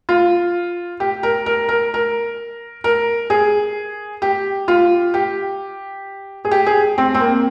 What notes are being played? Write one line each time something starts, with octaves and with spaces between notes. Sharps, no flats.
F4
G4
A#4
A#4
A#4
A#4
A#4
G#4
G4
F4
G4
G#4
G4
G#4
C4
C4
A#3